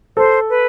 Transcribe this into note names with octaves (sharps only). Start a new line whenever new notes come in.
A4 C5
B4